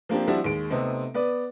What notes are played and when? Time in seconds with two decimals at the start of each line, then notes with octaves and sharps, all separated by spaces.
0.09 F3 A#3 C4 D4 G4
0.28 F3 G3 C4 D4 E4 F#4
0.44 D#2 G#3 D7
0.70 C3 A3 B3 C4 D#4
1.14 B3 B4 D5